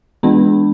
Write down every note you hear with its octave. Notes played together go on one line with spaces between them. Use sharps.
E3 G#3 B3 D4 B5